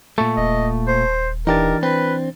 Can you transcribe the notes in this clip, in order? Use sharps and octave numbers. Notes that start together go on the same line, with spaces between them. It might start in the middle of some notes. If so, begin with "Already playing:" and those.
A#2 A3 A5 C#6
D#1 D#5
C5
E3 D4 D#4 G4 A#4 A6
C4 B4